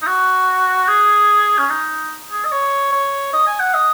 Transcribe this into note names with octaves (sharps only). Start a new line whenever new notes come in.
D#4
F#4
G#4
C#4
D#4
G#4
D#5
C#5
C#5
D#5
G#5
F#5
D#5